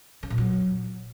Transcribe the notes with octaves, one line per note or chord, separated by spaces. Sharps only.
C#3
A#2
F#3